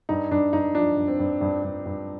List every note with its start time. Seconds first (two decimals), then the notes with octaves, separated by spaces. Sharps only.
0.09 G2 D#4
0.31 G2 D4
0.53 G2 D#4
0.75 F3 D4
0.97 G2
1.08 C4
1.19 G2
1.41 G2
1.64 G2
1.86 G2